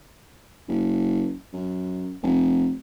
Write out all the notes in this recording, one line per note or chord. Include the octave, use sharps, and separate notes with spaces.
F#1
F#2
F1